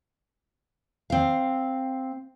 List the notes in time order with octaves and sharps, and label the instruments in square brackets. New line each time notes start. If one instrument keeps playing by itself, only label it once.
[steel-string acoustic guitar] C4 F5